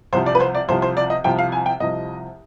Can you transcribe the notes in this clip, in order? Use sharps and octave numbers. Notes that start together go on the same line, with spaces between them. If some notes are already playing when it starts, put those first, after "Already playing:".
C2 C3 F3 C5
D5
B4
C5
D5
C2 C3 F3 C5
C5
D5
D#5
C2 C3 F3 G5
F5
G#5
G5
C2 C3 F3 D#5